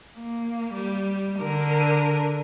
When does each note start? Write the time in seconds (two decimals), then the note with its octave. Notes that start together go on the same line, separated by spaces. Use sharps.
0.17 A#3
0.73 G3
1.38 D3 A#4